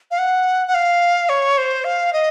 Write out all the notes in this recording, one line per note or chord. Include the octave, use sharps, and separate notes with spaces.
F5
F#5
F#5
F5
C#5
C5
F5
D#5